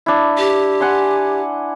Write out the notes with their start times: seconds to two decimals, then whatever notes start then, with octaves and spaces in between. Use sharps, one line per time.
0.06 D4 E4
0.38 G4
0.80 F#5 G#5 C6